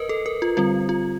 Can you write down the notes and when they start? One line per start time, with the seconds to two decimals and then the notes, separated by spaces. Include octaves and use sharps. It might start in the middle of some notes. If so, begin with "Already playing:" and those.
Already playing: A#4 B4 D#5
0.09 A4
0.26 A#4
0.42 F4
0.57 D3 G3 C4 F4
0.89 F4